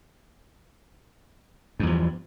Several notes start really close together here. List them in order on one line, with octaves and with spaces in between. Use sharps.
G2 E2 F3